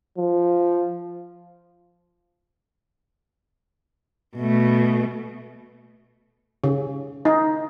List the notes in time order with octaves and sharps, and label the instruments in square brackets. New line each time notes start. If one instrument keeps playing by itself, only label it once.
[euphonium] F3
[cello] B2 A3
[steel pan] C#3
D#4